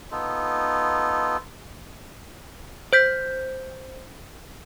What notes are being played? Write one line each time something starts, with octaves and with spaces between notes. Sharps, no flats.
B3 D#4 F4 A4
C5 G6 B6